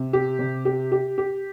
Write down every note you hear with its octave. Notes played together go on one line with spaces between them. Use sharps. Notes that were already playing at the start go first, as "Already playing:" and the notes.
Already playing: C3
G4
C3
G4
G4
G4